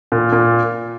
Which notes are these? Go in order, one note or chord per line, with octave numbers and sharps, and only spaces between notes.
A#2
A#2